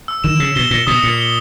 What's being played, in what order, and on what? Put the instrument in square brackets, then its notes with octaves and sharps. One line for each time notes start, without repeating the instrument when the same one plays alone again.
[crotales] E6
[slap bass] D#3 [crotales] E7
[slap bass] C#3 [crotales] E6
[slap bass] B2 [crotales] G7
[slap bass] A#2 [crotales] G7
[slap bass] B2 [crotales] D#6
[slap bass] A#2 [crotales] C#7
[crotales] G7